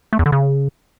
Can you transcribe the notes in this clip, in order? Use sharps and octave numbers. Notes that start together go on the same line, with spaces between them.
A3
E2
D3
C#3